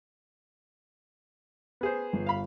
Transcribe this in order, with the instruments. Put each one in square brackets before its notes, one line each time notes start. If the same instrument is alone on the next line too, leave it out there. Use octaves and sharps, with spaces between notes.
[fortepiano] B3 G#4 C5
[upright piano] G1
[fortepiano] F5 B5